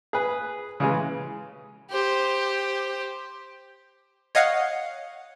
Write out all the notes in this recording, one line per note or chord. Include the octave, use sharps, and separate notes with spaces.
G#4 B4
C#3 E3 G#3
G4 C5
C#5 D#5 F5 F#5